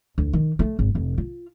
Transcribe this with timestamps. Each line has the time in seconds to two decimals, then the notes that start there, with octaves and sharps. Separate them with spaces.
0.18 D2
0.33 D#3
0.59 A3
0.79 G#1
0.95 F1
1.18 F4